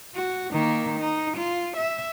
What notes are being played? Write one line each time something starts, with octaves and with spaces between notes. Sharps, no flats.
F#4
D#3 A#3
D#4
F4
E5